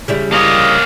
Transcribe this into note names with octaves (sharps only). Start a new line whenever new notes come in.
C#3 G3 E4
A#3 C#5 D#5